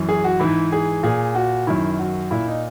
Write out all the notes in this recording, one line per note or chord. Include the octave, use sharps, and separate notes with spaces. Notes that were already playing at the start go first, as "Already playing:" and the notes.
Already playing: F#2 E3
G#4
F#4
G#2 E3 E4
G#4
A#2 G#4
F#4
F#2 D#3 E4
F#4
A#2 E4
D#4